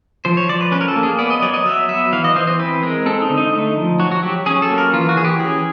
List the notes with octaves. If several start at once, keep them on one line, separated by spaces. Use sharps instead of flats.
F3 C5
C#5
F3 D5
B4
C#4 B4
A#4
A4
A#3
G#4
B3 D5
D#5
F#3 D5
D#5
F#3 E5
B3 E5
E3 F5
D#5
E3 C5
C5
C4 B4
G#3 A#4
C4 A4
D#4
D3
D#4
A3 D#4
F3
F#3 F#4
F#4
F#3 G4
C#4 G#4
A4
A#3
A#4
E3 F4
F#4
E3 G#4
G4
C#4 G#4